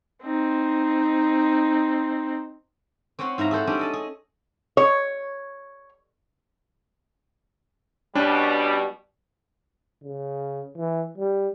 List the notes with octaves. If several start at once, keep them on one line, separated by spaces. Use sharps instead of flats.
C4 D#4
C4 C#4 C#5 F#5 C6
G#2 E4 F5 A#5
G#4 A4 C5 F#5
G3 C#4 D4
A4 D#5 A5
G#4
C#5
B2 G3 C#4 D4
C#3
E3
G3